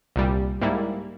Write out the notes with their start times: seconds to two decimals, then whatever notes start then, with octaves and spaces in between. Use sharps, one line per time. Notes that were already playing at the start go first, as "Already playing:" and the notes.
0.16 C2 A#2 G3
0.61 G#2 G3 A#3 E4